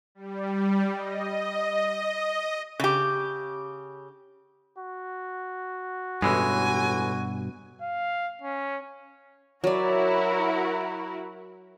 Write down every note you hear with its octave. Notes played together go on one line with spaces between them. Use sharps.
G3
D#5
C#3 G4
F#4
A1 G2 B2 E3 G#3 G#5
F5
C#4
F#3 E4 F#4 A#4 D5